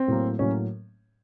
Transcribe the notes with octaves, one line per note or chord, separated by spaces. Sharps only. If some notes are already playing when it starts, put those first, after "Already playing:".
Already playing: C4
A2 F#3 A#3
A2 F#3 A#3 C#4